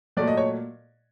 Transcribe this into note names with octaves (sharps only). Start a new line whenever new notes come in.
A#2 F#3 A3 D5
D#5
C#5